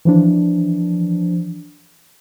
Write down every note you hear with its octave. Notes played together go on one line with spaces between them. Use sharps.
E3 F3 D4